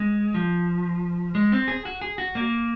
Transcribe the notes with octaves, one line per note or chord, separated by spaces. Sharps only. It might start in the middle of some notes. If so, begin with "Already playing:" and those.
Already playing: G#3
F3
G#3
C4
G#4
F#4
G#4
F#4
A#3